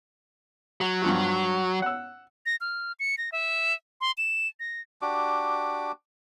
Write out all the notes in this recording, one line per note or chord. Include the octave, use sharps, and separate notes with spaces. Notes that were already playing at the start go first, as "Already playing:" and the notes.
F#3
G2 F3 F#4
F#5 E6
A#6
F6
C#7
A#6
E5
C6
E7
A#6
D4 F#4 G4 D6